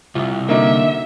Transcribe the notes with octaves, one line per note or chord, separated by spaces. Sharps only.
C2 C3 F4
D3 A#3 D#4 F#4 D5 E5